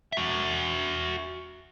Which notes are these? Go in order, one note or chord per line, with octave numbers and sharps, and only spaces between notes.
F#4 E5